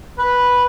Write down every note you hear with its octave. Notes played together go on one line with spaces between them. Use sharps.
B4